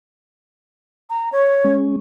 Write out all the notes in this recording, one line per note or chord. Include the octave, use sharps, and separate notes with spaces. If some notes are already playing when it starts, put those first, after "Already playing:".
A#5
C#5
G#3 C#4